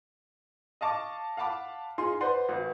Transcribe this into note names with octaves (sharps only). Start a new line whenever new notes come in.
D#5 F5 A5 C#6 D6
F5 F#5 A5 B5 D6
D#4 F4 G#4 C6
B4 C5 D5 F#5 C6
G#1 F#4 B4